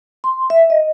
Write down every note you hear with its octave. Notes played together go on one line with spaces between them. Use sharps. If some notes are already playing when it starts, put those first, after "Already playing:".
C6
E5
D#5